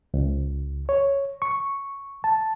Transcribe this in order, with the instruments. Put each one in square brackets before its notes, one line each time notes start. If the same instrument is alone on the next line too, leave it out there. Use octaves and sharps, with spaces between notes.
[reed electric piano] C#2
C#5
C#6
A5